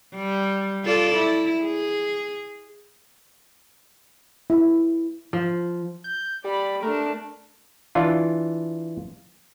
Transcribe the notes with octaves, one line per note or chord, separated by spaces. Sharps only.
G3
F4 A4 D5
E4
G#4
E4
F3
G6
G3 D5 B5
A3 D4 A#4
E3 D4 F4